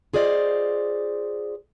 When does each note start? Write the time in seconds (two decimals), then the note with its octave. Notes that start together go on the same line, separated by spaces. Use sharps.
0.13 F4 G#4 C5 D5 D#5